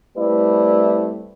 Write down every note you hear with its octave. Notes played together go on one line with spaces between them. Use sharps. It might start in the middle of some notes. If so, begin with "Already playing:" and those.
G3 A3 C4 E4 B4 D5